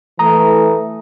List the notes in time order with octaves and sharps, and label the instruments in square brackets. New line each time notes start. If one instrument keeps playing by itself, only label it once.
[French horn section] E3 A3 [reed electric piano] A#5 D#6